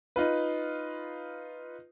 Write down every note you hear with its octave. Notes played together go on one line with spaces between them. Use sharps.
D#4 F4 B4